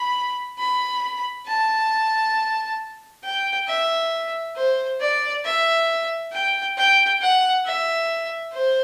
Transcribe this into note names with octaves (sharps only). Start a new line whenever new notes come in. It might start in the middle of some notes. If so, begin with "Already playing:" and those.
Already playing: B5
B5
A5
G5
E5
C5
D5
E5
G5
G5
F#5
E5
C5